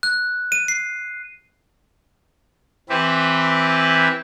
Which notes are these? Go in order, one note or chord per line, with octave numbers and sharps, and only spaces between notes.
F#6
D#7
C7
E3 C4 E4 G4 B4